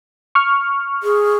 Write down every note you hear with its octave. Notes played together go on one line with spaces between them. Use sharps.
C#6 F6
G#4